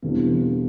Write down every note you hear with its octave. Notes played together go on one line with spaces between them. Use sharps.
E1 E2 D3 G3 B3 C4